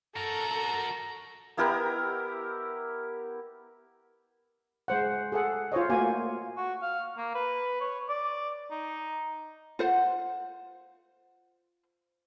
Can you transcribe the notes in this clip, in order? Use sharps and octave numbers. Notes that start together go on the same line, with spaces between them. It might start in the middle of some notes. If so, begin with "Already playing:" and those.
F#4 A4 A#4 A#5
B3 E4 G4 A#4
G#3 C5 F#5
G#4 A4 F#5
F4 C5 C#5 D#5
A3 A#3 F#4 G#5
F#4
F5
A#3
B4
C#5
D5
D#4
F4 C5 F#5